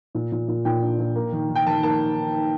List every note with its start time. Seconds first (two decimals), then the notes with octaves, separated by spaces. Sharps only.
0.15 A#2
0.32 A#2
0.48 A#2
0.65 A#2 G5
0.82 D4
0.99 A#2
1.16 A#3
1.32 D#3
1.49 D#3
1.55 G5
1.66 D#3 A5
1.83 A#3 A5